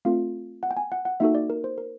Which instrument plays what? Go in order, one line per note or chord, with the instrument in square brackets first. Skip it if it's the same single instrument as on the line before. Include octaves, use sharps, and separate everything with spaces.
[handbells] A3 C4 F4 A4 F5
F#5
G5
G#5
F#5
F#5
A#3 D#4 F#4 A4 E5
D5
A#4
C5
A#4